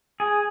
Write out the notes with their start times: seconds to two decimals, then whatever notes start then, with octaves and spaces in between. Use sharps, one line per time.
0.20 G#4